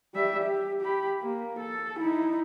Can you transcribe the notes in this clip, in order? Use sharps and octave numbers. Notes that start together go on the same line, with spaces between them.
G3 E5
G4
G4 B5
A#3
A4
D#4 E4